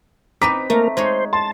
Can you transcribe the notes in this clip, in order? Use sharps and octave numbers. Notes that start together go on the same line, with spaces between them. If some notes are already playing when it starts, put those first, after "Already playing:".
C4 D#4 B4 A#5 D6 B6
A3 A#3 A#4
G#3 D#4 C5 C#5
A5 C6